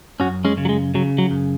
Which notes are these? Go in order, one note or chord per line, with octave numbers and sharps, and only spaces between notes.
F#2 C#4 F#4
G#3 C#4
C#3
F#3
G#3
C#3 F#3
F#3
F#2